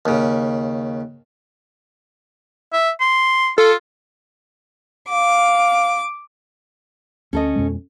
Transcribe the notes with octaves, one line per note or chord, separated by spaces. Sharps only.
D#2 C#3
E5
C6
F4 A4
F5 D6
D2 C#4 A4 D#5
F2 B2 G#3